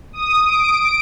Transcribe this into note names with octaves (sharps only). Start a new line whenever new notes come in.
D#6
D7